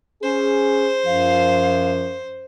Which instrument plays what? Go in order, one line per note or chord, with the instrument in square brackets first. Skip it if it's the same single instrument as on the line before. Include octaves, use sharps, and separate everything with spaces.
[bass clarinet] C#4 [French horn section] G#4 [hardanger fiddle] C5
[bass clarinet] F#2 [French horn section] F3 [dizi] F5